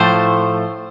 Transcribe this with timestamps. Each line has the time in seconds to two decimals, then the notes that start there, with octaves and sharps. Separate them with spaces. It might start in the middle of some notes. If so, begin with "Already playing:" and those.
Already playing: A2 F3 A3 C5